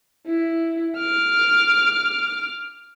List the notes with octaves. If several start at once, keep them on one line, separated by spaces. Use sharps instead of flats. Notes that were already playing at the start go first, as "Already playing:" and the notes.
E4
D6 F6